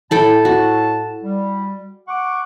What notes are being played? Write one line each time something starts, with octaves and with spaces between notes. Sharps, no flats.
A2 E4 A4 G5 A5
F#4
G3
F#5 C#6 D6